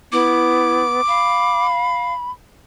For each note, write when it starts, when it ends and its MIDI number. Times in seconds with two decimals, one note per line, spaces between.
0.12 1.01 59
0.12 0.83 64
0.12 1.66 86
1.08 2.13 77
1.08 2.31 83